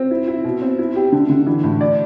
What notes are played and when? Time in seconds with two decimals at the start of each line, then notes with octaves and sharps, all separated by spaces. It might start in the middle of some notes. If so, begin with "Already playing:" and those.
Already playing: C4
0.11 E4
0.28 E4
0.44 B2
0.62 C4
0.79 E4
0.96 G4
1.12 D3
1.30 D3
1.47 E3
1.64 A2
1.81 D5